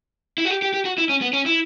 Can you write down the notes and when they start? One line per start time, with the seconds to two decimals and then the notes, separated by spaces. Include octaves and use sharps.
0.38 E4
0.45 F#4
0.50 G4
0.62 G4
0.74 G4
0.85 F#4
0.98 E4
1.09 C#4
1.22 B3
1.33 C#4
1.46 E4